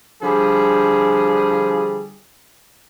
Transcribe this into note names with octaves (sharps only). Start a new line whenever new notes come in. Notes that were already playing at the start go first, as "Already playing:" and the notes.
D3 F3 G3 G#4